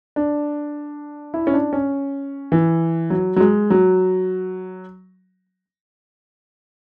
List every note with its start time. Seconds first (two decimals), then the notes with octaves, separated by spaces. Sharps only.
0.16 D4
1.34 E4
1.47 C#4
1.54 D4
1.73 C#4
2.52 E3
3.10 F#3
3.36 F#3
3.40 G#3
3.70 F#3